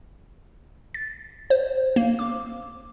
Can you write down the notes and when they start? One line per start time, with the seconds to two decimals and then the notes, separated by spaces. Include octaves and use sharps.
0.94 A6
1.50 C5
1.96 A#3
2.19 D6